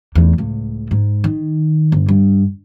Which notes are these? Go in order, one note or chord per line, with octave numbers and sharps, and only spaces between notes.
F1 E2
C#2 A2
G#2
D#3
G1
G2